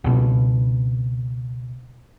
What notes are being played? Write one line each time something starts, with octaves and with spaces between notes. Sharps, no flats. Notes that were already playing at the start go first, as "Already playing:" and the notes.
C#2 B2